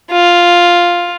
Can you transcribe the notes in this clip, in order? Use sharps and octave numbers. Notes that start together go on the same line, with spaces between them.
F4